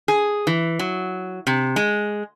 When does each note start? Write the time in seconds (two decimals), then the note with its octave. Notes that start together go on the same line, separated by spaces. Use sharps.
0.08 G#4
0.47 E3
0.79 F#3
1.47 C3
1.76 G#3